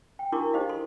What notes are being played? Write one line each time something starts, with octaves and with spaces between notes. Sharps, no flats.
G5
D4 E4 F#4 A#4 C#6 D6
D#4 G4 C5 D#5 F5
A4 C6